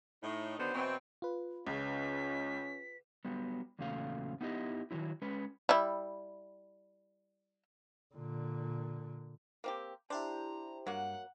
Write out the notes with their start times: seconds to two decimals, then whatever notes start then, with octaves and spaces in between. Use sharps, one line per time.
0.23 A2 D#4
0.58 D3 D#3 F#3 B3 C5
0.74 B2 E3 F#3 C4
1.22 F4 B4
1.67 C#2 C#3 C#4 B6
3.25 F#3 G3 B3
3.79 E2 A#2 C#3 F#3 A3 F5
4.41 B3 D#4 E4 G4 D#5
4.91 D#3 E3 F#3 E4
5.22 G#3 C#4 B4
5.69 G3 E4
8.15 A#2 D3
9.64 A#3 C4 G4
10.10 D4 E4 G4 C5 A#5
10.87 G2 F#3 A#3 F#5